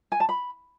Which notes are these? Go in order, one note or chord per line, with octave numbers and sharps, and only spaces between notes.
G#5
A5
B5